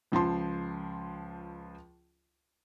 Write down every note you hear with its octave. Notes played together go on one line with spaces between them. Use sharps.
C#2 F3 A5 C6